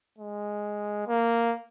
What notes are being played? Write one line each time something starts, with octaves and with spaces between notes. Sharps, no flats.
G#3
A#3